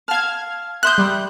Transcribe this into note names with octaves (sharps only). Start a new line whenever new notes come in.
F5 A5 F6 G#6
E5 C6 D#6 F#6 G6
G3